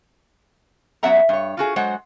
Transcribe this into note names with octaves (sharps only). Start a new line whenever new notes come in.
F#2 F#3 B3 E5 F#5 A#5
G2 C#5
F4 F#4 G#4
F#3 G#3 C5 F#5